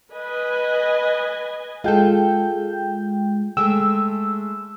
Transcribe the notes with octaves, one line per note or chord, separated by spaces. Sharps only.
B4 D#5 G#5
G#3 F4 G#4 A4 G5 G6
G#3 A3 G5 E6